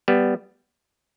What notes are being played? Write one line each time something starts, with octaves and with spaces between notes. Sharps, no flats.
G3 B3